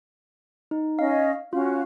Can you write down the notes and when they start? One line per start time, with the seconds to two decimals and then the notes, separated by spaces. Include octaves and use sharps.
0.71 D#4
0.99 C#4 D#5 F5
1.53 C#4 F4 F#4 F5